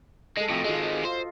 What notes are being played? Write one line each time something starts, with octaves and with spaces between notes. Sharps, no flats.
G#3 A4 D#5
F2 A2 F4 F#4
D#3 G#3 F4 D#5
F4 C5